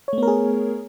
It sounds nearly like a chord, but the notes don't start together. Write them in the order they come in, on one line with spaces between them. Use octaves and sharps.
C#5 A3 B3 A#4 G#4